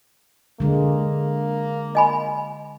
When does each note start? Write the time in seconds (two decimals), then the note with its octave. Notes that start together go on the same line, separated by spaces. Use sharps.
0.60 D3 G#3 A#3
1.95 D#5 G#5 B5